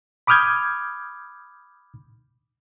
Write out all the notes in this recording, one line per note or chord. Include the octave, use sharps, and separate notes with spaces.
B5 D6 D#6 F6 G6 G#6